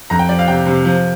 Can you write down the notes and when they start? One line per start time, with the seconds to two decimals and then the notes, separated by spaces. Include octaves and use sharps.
0.10 F2 A#5
0.19 G5
0.29 F3 D5
0.39 F5
0.48 C3 G5
0.66 C3
0.85 F3